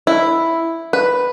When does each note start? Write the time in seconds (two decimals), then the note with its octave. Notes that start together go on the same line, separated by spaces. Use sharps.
0.07 E4
0.93 B4